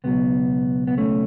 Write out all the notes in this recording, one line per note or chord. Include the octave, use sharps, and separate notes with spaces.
C#2 B2 F#3 B3
B3
A3 C#4